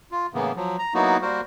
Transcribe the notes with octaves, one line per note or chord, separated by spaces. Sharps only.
F4
A2 C#3 E3 A#3 B3
F3 F#3
A#5
F#3 A#3 B3 D#4 E4 F#4
G3 A#3 F#4 A#4 C5